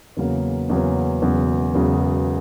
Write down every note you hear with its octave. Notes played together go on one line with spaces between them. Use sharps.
E2 C#3 F#3 A#3 C#4
E2 C#3 F#3 A#3 C#4
E1 E2 C#3 F#3
E1 E2 C#3 F#3